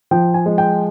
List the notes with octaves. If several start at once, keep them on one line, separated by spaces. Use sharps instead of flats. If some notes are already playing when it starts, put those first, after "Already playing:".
F3 G5
G#5
G#3
G5